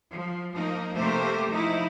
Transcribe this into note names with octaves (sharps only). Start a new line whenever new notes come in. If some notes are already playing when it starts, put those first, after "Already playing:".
F3
F3 A#3 D#4
C3 A3 A#3 C4 G4 C5
F3 D#4 E4